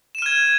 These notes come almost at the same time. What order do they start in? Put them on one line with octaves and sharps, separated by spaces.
E7 D#7 F6 G#6